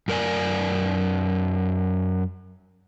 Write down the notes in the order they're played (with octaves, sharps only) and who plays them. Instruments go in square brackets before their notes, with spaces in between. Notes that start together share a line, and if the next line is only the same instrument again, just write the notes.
[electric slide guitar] F#2 A#4 D5 G#5